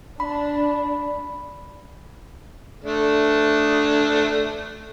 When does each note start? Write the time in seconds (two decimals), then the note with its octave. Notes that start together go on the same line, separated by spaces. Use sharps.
0.20 D4 B5
2.84 A3 D4